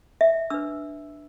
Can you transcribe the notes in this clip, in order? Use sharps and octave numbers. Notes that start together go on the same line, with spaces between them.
E5
D4 B4 E6